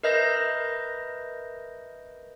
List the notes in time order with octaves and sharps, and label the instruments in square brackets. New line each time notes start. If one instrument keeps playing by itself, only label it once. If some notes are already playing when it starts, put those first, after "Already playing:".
[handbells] A#4 B4 D#5 E5 G6 A#6